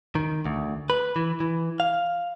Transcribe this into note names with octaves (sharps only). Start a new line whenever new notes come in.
D#3
D2
B4
E3
E3
F5